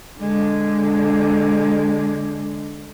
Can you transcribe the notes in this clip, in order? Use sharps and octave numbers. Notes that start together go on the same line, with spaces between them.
D3 G#3